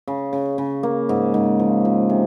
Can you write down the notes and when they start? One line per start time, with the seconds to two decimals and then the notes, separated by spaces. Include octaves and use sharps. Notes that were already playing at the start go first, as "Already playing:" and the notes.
0.08 C#3
0.33 C#3
0.58 C#3
0.83 A#3
1.09 G#2
1.34 G#2
1.59 F3
1.85 F3
2.10 C3